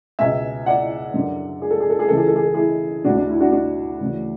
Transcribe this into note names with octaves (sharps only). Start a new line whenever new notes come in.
C#2 B2 E5 G#5
D5 F#5
F#2 D3
G#4
A4
G#4
A4
G#4
C#2 C#3 E3 A4
G#4
A4
G#4
A4
E4 G#4
D2 D3 D4 F#4
D4
E4
D4 F#4
D4 F#4
D2 C#3 E3